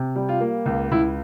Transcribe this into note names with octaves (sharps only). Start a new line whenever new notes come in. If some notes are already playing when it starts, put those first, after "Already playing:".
Already playing: C3
G3
F4
A#3
C#2
C#2 E4